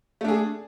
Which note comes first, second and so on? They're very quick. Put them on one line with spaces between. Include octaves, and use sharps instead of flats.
A3 D4 G#4